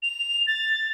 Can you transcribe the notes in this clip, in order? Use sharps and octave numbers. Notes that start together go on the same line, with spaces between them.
F7
A6